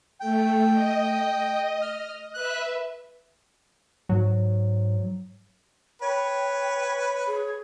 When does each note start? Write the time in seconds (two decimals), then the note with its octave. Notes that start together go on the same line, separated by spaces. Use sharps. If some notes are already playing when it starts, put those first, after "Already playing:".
0.21 A3 G5
0.72 D#5
1.82 F6
2.34 B4 E5 F#6
4.09 G#2 F#3
6.01 B4 C#5 G5
7.28 G#4